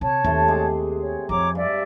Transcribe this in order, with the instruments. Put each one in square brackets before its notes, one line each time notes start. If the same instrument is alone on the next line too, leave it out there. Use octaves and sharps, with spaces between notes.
[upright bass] C3 [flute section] C#5 A5
[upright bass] D#2 [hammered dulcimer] C3 A3 C5
[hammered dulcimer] G#3 G#4 D6
[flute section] C#5
[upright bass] F2 F3 [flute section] C#5 A#5 D6
[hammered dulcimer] G2 [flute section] D5 E5